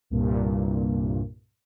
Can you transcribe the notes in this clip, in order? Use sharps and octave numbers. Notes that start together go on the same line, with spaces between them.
C2 G2 A#2